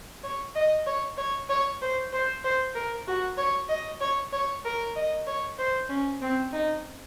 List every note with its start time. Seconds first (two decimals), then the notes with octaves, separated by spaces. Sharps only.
0.23 C#5
0.55 D#5
0.87 C#5
1.17 C#5
1.49 C#5
1.81 C5
2.13 C5
2.44 C5
2.75 A#4
3.07 F#4
3.37 C#5
3.69 D#5
4.01 C#5
4.33 C#5
4.64 A#4
4.96 D#5
5.27 C#5
5.59 C5
5.89 C#4
6.22 C4
6.53 D#4